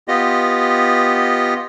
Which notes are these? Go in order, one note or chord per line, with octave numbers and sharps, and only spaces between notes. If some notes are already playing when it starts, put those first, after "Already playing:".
B3 F4 G4 D#5